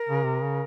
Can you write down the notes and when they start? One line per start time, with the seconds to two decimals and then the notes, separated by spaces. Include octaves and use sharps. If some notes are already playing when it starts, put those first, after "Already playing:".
Already playing: A#4
0.09 C#3
0.23 C3
0.42 C#3